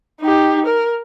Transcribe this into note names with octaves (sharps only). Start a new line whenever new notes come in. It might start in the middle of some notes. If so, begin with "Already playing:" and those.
D#4 G4
A#4